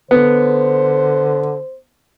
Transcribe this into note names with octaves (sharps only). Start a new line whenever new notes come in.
D3 B3 C5